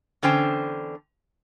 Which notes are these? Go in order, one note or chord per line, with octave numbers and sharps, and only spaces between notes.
E2 D3 C#4 C5 G5